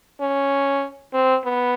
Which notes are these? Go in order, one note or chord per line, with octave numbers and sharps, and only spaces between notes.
C#4
C4
B3